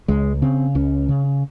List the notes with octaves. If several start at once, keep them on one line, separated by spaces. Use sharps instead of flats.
C#2 G#3
C#3 C4
C#2 C#4
C#3